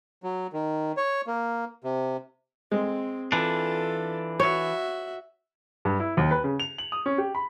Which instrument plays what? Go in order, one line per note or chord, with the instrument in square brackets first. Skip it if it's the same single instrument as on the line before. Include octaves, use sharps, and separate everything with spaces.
[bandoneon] F#3
D#3
C#5
A#3
C3
[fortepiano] G#3 [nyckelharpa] C4
[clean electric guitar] E3 D4 [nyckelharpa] F4 A4
[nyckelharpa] F#4 E5 [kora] C#5
[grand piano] G2
E4
D#2
B4
C#3
F7
F#7
D#6
C#4
G4
B5